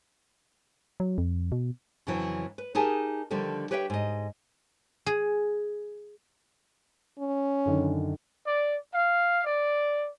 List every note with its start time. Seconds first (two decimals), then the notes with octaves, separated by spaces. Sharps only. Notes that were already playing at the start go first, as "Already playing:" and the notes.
1.00 F#3
1.18 F2
1.52 B2
2.07 F2 C#3 E3 F#3
2.58 B4
2.75 D#4 G4 G#4 A#4 G#5 A5
3.30 D3 D#3 F3 G3 A4
3.71 G4 B4 C#5 E5 F5 G5
3.90 G#2 D#5
5.06 G#4
7.18 C#4
7.65 F#2 D3 D#3
8.45 D5
8.93 F5
9.45 D5